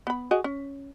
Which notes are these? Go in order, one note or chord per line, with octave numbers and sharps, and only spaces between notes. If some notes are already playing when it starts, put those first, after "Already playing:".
B3 B5
F#4 G#4 D#5
C#4